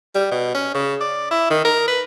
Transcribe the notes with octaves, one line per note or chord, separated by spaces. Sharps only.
G3
B2
C#4
C#3
D5
E4
D#3
A#4
B4